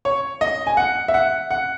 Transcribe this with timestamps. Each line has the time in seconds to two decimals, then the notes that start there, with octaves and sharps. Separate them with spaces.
0.05 C#5
0.41 D#5
0.67 G#5
0.77 F#5
1.08 E5
1.14 F#5
1.51 F#5